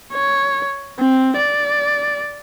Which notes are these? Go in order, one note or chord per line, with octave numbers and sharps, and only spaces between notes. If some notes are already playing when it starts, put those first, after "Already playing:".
C#5
C4
D5